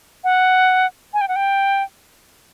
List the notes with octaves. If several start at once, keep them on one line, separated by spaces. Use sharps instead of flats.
F#5
G#5
G5
F#5
G5